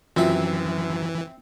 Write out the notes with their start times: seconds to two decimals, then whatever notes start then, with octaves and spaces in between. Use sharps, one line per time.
0.16 F#2 E3 C4 F4 E5